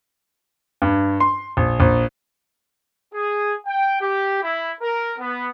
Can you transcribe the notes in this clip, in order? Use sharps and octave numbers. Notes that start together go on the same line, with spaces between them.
G2
C6
A#1
A#1
G#4
G5
G4
E4
A#4
B3